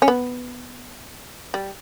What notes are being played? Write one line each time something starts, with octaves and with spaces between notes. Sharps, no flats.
C#4
B3
G3